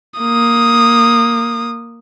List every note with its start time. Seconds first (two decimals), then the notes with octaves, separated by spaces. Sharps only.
0.19 A#3 D#6